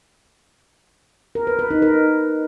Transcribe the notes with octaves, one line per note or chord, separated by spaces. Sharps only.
A#4
B4
B4
D#4
A#4